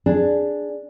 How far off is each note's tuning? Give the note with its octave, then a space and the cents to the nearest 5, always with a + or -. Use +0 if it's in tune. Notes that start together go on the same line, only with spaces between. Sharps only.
D4 +0 G#4 +0